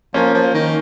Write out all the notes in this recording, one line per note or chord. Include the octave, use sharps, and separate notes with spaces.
F3 A#3 C#4
F3
D#3